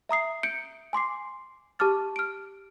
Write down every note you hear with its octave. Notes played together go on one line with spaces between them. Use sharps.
E5 A#5 D#6 C7
G6 C#7 D7
G#5 C6 D6 C7
G4 A5 D6 F6 A6
F6 D7